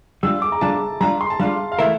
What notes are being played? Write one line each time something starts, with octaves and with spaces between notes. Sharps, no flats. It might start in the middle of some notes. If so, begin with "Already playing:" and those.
G3 D4 F4 E6
D6
A#5
G3 D4 F4 A5
G3 D4 F4 A#5
C6
A5
G3 D4 F4 F5
F5
E3 A3 E4 A#4 E5